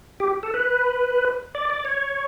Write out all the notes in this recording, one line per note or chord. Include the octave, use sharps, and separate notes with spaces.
G4
A4
B4
D5
D5
C#5